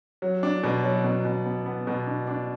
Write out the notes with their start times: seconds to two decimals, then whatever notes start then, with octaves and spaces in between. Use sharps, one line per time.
0.22 F#3
0.43 D4
0.63 B2
0.83 F#3
1.04 B2
1.25 B2
1.46 B3
1.66 B3
1.87 B2
2.07 D4
2.27 D4